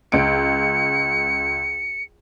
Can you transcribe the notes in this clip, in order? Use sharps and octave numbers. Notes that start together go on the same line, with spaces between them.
C#2 C#7 D7